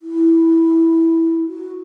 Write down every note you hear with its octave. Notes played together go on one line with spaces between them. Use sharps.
E4
F#4